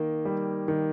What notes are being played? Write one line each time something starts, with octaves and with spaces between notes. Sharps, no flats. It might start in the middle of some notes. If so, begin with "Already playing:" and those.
Already playing: D#3 A#3
G3
D#3